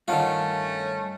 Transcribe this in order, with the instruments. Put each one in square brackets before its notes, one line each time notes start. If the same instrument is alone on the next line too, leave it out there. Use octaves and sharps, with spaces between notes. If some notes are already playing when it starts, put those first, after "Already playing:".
[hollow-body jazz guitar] G2 F#5 A5 [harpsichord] D#3 F4 [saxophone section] A3 C#4